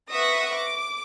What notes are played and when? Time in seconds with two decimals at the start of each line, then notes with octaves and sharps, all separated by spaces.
0.11 B4 E5 F#5 C#6 D#6 A#6
0.54 D6